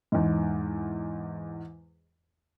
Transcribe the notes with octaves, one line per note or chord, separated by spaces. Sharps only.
E2 G#2